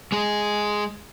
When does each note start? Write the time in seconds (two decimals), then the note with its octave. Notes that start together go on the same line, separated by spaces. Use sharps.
0.12 G#3 G#4